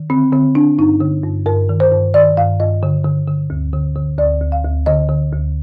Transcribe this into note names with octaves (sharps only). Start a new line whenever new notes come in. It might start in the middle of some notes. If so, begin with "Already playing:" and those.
Already playing: D#3
D3 C4
D3 C4
D3 D4
G2 D#4
D3
G2
G2 A#4
D#3
C5
G2
D#3 D5
G2 F5
G2 D#5
D3
D3
D3
D2
D3
D3
D2 D5
D2
F5
D2
D3 D#5
D3
D2